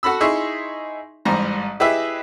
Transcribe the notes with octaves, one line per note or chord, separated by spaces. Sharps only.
F#4 A4 B5 E6
D#4 E4 G#4 E5 C6 C#6
A1 G#2 G3 A#5
E4 G4 G#4 B4 D#5 E5